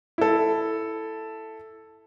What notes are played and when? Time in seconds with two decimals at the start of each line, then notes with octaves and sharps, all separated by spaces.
0.18 E4 A4